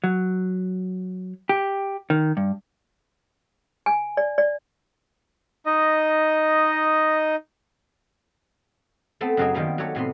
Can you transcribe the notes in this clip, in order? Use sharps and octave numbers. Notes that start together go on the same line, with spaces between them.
F#3
G4
D#3
G2
G#5
D5
D5
D#4 D#5
A3 B3 C4 A4
F#2 C#3 F#3 C4 D#4 G#4
D#3 G3 A#3 B3
F#3 G4 A4 C#5
A2 C3 B3 C6